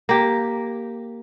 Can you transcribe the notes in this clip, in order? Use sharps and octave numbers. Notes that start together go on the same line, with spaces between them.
A#3 G4